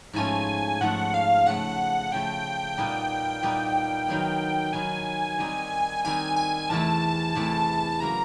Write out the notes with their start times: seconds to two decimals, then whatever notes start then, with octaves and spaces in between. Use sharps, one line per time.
0.13 G#2 F3 A3 C#4 G#5
0.81 G#2 F3 A3 C#4 F#5
1.14 F5
1.46 C#3 F3 A3 F#5
2.12 C#3 F3 A3 G5
2.77 A#2 G3 B3 D#4
3.43 A#2 G3 B3 D#4
4.08 D#3 F#3 B3
4.73 D#3 F#3 B3 G#5
5.38 D#3 G3 C4 D#4
6.05 D#3 G3 C4 D#4 G#5
6.36 G#5
6.69 E2 C3 E3 A3 A5
7.35 E2 C3 E3 A3
8.00 C#3 F#3 A#3 A#5